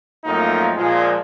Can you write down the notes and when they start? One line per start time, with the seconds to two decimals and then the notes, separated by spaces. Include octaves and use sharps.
0.25 F#2 F3 A3 A#3 C4 D#4
0.76 A#2 F3 G#3